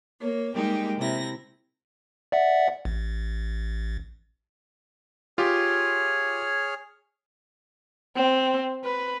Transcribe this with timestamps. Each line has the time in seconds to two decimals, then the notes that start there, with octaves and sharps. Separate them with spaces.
0.19 A#3 C#5
0.53 G3 G#3 A#3 D#4 G4
0.98 C3 E4 A#6
2.32 D5 E5 F#5
2.85 A1
5.38 F4 G4 G#4 C#5 F6
8.16 C4
8.84 B4